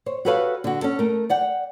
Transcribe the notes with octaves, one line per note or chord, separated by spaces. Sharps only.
C5 C#5
F#4 G4 A4 B4 C#5 F5
D3 F#4
C#4 A4
A3 A#4
D5 F#5 G5